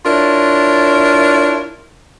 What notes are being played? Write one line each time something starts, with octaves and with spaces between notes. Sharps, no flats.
D4 E4 F4 A#4 C#5